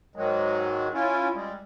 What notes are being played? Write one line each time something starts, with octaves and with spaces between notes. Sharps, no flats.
G#2 D#3 F#3 G#3
C#4 E4 F4
G3 G#3